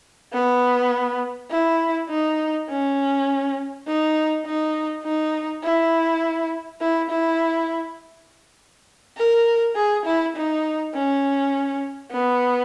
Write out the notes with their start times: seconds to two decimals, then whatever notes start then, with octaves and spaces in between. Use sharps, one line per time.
0.33 B3
1.51 E4
2.09 D#4
2.69 C#4
3.87 D#4
4.45 D#4
5.04 D#4
5.63 E4
6.81 E4
7.10 E4
9.18 A#4
9.76 G#4
10.05 E4
10.36 D#4
10.94 C#4
12.12 B3